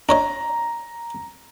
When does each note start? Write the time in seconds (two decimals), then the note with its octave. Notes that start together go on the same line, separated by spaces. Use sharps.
0.09 D4 C#5 D#5 A#5